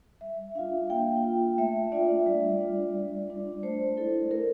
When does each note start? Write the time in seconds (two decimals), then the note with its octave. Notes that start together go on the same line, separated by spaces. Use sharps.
0.21 G3 E5
0.55 D4 F4 F5
0.89 A#3 G5
1.24 F4
1.58 A3 E5
1.92 D4 F4 D5
2.27 G3
2.61 D4 F4
2.95 G3
3.29 D4 F4
3.63 A3 C5
3.97 E4 A4
4.31 A3 A#4